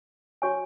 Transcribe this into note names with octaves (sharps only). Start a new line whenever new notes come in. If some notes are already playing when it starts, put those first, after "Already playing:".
F#4 C#5 G#5 C#6